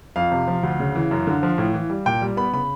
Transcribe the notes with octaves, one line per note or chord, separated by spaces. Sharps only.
F2 F5
C3
F3
D2
C#3
E3
F#2
D3
F3
A2
E3
G3
A#2 G5
G3
B3 B5
C#3 B5